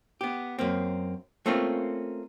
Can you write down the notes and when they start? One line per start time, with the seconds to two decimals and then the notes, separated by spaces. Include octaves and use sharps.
0.21 B3 G4
0.59 F#2 A#3 C4
1.46 A3 A#3 C4 C#4 F4